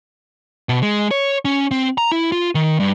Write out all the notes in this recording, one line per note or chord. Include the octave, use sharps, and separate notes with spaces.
B2
G#3
C#5
C#4
C4
A#5
E4
F4
D#3
G2